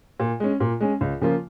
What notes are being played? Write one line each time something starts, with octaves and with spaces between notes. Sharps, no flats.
A#2
G#3 C#4
A#2
G#3 C#4
C#2
C#3 F3 A#3 F4